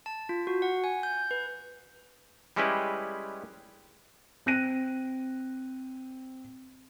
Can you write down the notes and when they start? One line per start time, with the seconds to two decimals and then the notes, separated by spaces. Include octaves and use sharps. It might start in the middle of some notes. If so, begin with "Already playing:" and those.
0.06 A5
0.29 F4
0.47 F#4
0.62 F#5
0.84 G#5
1.03 G6
1.31 B4
2.56 G3 G#3 C#4 E4 G4 B4
4.46 C4 F#6 A#6 D#7